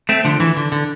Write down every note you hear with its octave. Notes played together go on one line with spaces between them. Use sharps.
A3 C4
D3 F3
E3
D3
D3